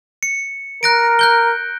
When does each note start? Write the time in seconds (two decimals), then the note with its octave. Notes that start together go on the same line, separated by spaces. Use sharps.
0.23 C#7
0.83 A#4 F#6 A#6 D7
1.19 F#6 G6 G7